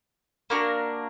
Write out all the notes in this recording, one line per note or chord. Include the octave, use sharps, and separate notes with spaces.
A#3 D4 F#4 A#4